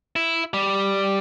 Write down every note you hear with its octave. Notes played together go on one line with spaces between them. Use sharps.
E4
G3